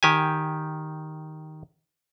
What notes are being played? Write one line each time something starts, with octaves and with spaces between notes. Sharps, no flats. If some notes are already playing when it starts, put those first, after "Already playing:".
D#3 G4 G#5